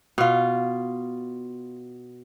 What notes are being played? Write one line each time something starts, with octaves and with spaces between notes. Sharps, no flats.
B2 F4